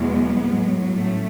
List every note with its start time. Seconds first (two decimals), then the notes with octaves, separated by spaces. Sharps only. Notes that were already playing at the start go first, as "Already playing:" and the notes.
Already playing: E2 B2 F#3 G#3 B3
0.49 A2 F#3
0.96 A3 C#4